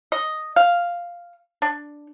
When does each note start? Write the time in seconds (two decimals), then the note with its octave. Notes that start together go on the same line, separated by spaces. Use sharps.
0.12 D#5
0.56 F5
1.62 D4